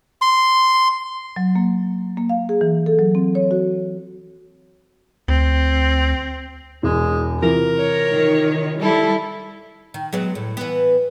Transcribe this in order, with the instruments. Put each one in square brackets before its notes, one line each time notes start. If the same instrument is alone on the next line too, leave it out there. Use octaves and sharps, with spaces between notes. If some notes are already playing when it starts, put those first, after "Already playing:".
[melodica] C6
[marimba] F#3
A#3
A#3
F5
G#4
E3
A4
F#3
C4
C#5
F#4
[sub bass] D2 [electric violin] C4
[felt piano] E1 E2 [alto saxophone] G#3
[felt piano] C3 E3 F4 [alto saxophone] A#4
[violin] C#5
[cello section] D#3
[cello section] G3 [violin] E4 A4
[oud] D#3
F#3 G#3 B3
A2
E3 B3